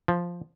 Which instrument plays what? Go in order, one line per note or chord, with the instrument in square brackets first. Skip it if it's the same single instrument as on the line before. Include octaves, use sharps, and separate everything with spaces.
[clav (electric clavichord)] F3